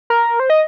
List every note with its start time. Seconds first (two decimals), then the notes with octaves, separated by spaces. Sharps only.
0.10 A#4
0.40 C5
0.50 D#5